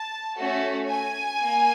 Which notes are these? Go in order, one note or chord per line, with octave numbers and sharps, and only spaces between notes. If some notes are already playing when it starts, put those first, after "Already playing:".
Already playing: A5
A3 C#4 F#4 A4
G#5
A#3